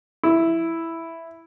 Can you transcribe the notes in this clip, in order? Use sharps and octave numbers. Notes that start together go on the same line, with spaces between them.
E4